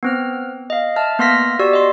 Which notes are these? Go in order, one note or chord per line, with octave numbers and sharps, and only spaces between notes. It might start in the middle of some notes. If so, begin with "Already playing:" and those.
B3 C4 F6
D#5 F5
E5 A5 F6
A#3 B3 C6 F6 A#6 B6
F#4 G4 D5 E6
D#5 C6